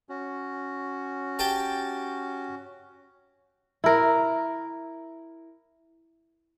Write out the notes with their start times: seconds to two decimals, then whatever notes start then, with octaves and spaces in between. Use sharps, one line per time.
0.09 C#4 F#4
1.39 G4 G5 A5
3.84 E4 A#4